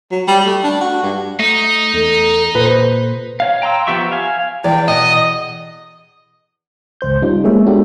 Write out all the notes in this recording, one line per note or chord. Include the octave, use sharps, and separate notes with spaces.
F#3
G3
A3
D4
F#4
G2
A3 D#4
E2 A4
A#2 B4 C5
C#5 F5
G5 A#5 C6 E6
F3 B3 G4 E5 C#6
F5 G#5
E2 D5 G5
B2 D#5 D#6
G1 C#2 C5 G6
G3 C#4 D#4 F4
G#3 A#3 B3 G#4 C#5 E5
G#3 B3 D4 F#4 G4 A4